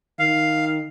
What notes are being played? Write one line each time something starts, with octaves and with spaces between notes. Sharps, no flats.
D#3 F5